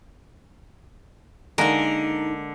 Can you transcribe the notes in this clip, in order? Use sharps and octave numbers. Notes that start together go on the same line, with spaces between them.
D3 G#3 A#3 D#4 A#4